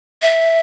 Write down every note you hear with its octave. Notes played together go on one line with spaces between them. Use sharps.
E5